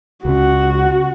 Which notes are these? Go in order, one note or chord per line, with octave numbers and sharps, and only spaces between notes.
C#2 C#3 F#4